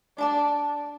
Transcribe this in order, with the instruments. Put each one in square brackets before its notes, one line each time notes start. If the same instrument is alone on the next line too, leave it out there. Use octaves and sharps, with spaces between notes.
[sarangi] D4 [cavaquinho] D5 A5 D6